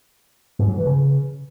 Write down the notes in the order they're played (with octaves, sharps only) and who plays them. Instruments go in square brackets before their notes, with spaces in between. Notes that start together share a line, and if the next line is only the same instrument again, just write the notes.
[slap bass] G#2
F#3
E3
C#3